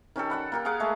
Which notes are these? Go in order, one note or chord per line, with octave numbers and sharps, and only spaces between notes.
D#3 C#4 G4 A4
D5 F#5 B5
A#3 G4 A#4
G#4 F5 F#5 D6
G#3 A3 G#4